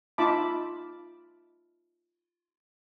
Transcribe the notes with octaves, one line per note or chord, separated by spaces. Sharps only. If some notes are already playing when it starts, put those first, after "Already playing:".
D#4 F4 E5 A5 B5 D6